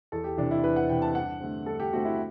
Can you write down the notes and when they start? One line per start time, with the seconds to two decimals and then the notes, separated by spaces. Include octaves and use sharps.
0.12 E2 A4
0.24 G4
0.37 C3 E3 D4
0.51 E4
0.63 E2 B4
0.76 F#5
0.89 C3 E3 G5
1.02 A5
1.15 G2 F#5
1.40 D3 A3 C4
1.66 G2 A4
1.80 G4
1.93 D3 A3 C4 F#4
2.05 E4